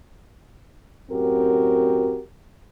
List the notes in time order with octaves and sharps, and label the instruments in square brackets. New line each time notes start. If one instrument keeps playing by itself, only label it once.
[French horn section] F#2 A2 C4 F#4 G4 A#4